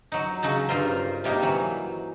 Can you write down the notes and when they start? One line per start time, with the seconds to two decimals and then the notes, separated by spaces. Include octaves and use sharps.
0.12 F#3 D#4
0.42 C#3 F#3 D#4 A5
0.69 G2 F4 A#4 C5
1.24 C3 G3 A#3 D#4
1.42 E3 F#3